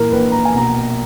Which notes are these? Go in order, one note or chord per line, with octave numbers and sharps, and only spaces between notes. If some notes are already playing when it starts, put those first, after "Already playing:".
Already playing: A#2 E3 A#4
A#1 B4
A#5
G#5
B2 A#5